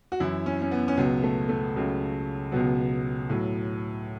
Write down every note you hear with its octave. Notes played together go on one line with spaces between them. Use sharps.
F#4
F#2 E3 E4
C#4
C#4
B3
C#4
C#2 B2 F#3 B3
A3
A3
C#2 C#3 F#3
C#2 B2 F#3 B3
A2 F#3